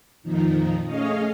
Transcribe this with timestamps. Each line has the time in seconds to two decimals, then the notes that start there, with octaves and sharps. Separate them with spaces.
0.23 F2 A#2 D#3 F3 D#4
0.84 A3 C#4 G#4 C#5 D#5 F5